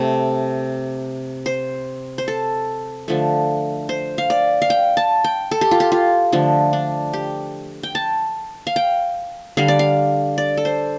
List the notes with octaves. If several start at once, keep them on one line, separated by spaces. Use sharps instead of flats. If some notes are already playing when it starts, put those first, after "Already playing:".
Already playing: C3 A3
C5
C5
A4
D3 F3 A3
C5
F5
D5
F5
G5
A5
G5
A4
G4
F4
G4
F4
D3 F3 A3
D4
G4
G5
A5
F5
G5
D3 G3 F5
D5
F5
D5
A4
C5